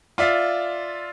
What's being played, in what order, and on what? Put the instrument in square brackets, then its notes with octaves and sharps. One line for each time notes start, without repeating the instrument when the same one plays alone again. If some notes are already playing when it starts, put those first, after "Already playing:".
[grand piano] F4 D5 E5 F5